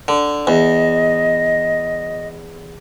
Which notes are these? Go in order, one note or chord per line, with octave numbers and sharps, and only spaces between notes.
D3
E2 D#5